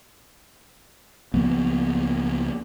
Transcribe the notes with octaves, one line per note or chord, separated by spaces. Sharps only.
C#2 F3 A#3 B3